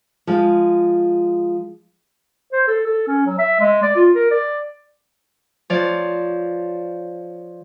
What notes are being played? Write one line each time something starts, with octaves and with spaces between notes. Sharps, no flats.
F3 G#3 F5
C5
A4
A4
C#4
F#3
E5
G#3
D5
F4
A#4
D5
F3 C#5 D5 F5